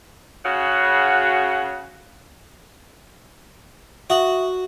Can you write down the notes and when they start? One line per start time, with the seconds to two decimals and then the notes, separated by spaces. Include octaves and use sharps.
0.44 C#3 F#4
4.10 F#4 E5 D#6 F#7